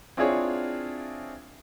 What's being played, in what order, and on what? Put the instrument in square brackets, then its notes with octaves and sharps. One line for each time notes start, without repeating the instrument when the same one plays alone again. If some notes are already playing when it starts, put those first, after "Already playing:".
[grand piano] C4 D4 E4 F4 G#4 C#5